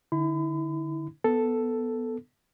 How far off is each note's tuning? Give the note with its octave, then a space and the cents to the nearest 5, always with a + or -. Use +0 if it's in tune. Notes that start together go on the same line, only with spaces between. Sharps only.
D3 +20 E4 -30 B5 +40
B3 +0 A4 +0